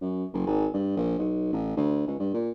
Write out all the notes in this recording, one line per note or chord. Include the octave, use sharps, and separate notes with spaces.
F#2
F#1
G#1
G2
A#1
B1
A1
D2
C#2
G2
A#2